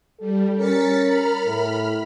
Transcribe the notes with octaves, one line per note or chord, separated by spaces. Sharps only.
G3 A4
C#4 A#4 A6 B6 C#7
B5 F6
A2